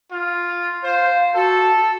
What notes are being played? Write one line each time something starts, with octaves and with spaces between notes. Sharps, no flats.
F4
C5 F5
F#4 A4